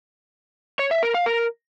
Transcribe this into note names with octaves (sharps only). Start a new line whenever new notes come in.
C#5
E5
A#4
F5
A#4